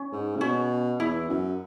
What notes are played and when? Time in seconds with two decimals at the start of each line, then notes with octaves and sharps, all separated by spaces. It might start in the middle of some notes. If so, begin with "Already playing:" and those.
Already playing: C#4
0.12 G#2
0.36 C#3
0.41 B2 C#4
0.99 E2 E4
1.29 F#2